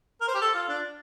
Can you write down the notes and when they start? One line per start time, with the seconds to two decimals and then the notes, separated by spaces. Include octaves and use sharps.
0.21 A#4
0.28 C5
0.34 G4
0.41 A4
0.54 F4
0.68 D4